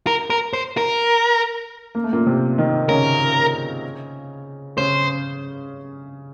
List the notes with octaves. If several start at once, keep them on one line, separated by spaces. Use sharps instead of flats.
A#4
A#4
C5
A#4
A#3
A3
A#2 A#3
C3 C4
D#3 D#4
C#3 C#4 A#4
C#3 C#4 C5